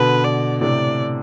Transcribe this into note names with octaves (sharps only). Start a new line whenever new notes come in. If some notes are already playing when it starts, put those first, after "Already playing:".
Already playing: B2 D3 B4
D5
A2 C3 D5